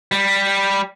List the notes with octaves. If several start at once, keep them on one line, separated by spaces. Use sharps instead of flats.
G3